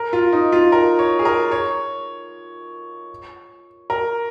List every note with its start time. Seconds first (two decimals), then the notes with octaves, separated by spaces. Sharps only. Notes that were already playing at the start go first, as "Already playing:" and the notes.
Already playing: A#4
0.13 F4
0.33 D#4
0.52 F4
0.72 A#4
0.99 C#5
1.19 G#4
1.25 A#4
1.52 C#5
3.90 A#4